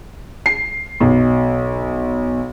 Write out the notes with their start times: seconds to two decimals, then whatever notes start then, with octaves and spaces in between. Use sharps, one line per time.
0.46 C7
1.00 B1